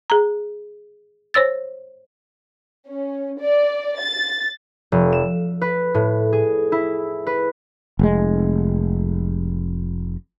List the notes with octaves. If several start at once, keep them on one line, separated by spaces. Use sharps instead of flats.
G#4 A#5
C5 C#5 E6 A6
C#4
D5
A6
F1
E7
B4
A2
G#4
E4
B4
F1 G#3